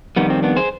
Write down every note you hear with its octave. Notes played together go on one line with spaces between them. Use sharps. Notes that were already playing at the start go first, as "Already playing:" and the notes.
F2 D#3 G3 B3
C4
B3 D4
G#4 C5